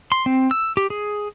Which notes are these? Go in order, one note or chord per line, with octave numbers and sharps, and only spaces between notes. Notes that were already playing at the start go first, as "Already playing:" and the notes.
C6
C4
E6
G4
G#4